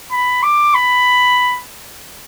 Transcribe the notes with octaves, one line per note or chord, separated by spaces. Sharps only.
B5
D6
B5